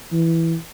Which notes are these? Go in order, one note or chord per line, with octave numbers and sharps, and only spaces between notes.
E3